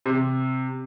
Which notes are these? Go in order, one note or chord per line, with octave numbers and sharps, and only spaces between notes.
C3